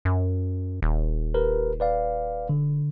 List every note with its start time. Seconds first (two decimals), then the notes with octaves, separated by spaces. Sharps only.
0.05 F#2
0.82 D#1
1.34 G4 A#4 B4
1.80 B4 D5 F5
2.49 D3